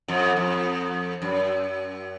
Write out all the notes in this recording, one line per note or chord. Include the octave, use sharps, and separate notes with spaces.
F2
F2
F#2